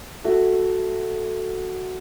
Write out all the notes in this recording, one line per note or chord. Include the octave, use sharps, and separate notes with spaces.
A3 F#4